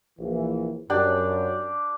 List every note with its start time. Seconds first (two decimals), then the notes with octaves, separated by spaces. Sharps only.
0.19 A#1 E3
0.90 F#2 D4 G4 D5